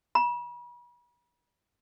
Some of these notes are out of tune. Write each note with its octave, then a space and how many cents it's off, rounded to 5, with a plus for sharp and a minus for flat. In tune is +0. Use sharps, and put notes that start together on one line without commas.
B5 -40